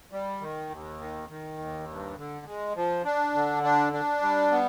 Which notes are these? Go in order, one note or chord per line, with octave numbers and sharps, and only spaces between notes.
G3
D#3
D#2
D#3
D#3
D#2
G2
D3
G#3
F3
D4
D3
D4
D4
G3
B3